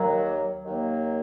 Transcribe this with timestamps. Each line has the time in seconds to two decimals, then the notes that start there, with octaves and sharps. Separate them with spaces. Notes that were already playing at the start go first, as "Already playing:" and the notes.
Already playing: D#2 D#3 F#3 A#3
0.63 D#2 D#3 F#3 A#3